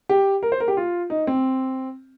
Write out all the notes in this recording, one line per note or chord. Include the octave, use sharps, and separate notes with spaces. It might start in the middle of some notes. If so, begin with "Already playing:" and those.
G4
A#4
C5
A#4
G4
F4
D#4
C4